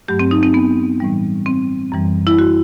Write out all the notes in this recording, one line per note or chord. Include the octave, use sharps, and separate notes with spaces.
G2 F#3 A3 G4
C4
D#4
C4
B3
A2 E3 G3
C4
F#2 E3 G3
E4
F#4